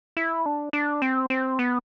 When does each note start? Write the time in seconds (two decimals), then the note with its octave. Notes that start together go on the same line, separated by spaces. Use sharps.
0.17 E4
0.46 D4
0.73 D4
1.02 C4
1.30 C4
1.59 B3